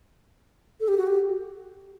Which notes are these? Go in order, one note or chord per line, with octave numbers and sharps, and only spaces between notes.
A4
G4
F#4
G4